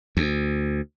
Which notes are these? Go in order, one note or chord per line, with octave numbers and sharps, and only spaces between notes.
D2